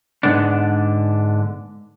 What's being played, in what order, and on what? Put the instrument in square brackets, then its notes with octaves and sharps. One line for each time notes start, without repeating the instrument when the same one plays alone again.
[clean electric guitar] G#2 D3 B3 D4